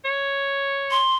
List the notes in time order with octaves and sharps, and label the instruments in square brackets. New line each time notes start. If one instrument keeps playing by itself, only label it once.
[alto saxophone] C#5
[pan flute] C6